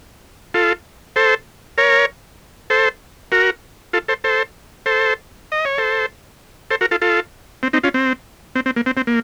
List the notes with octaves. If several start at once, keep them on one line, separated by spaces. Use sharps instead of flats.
F4 A4
A4 C5
A#4 C#5
A4 C5
F#4 A#4
F4 A4
A4 C5
A4 C5
A4 C5
D#5
C#5
A4 C5
A4 C5
F#4 A#4
F4 A4
F4 A4
C4
C4 D#4
C#4 F4
C4
C4
C4
A#3
C4
C4
A#3